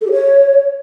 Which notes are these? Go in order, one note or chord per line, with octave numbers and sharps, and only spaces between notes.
A4
G4
C#5